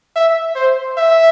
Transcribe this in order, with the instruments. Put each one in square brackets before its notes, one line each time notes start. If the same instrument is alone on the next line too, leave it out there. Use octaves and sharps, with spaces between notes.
[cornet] E5
C5
E5